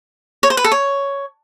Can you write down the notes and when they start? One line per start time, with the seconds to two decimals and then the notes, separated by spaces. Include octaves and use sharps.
0.43 C#5
0.50 C5
0.57 B4
0.64 A4
0.72 C#5